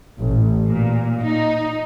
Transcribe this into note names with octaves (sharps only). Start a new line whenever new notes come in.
A1
A#2
D#4